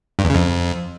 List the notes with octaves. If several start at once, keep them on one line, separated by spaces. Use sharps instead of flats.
G2
E2
C#3
F2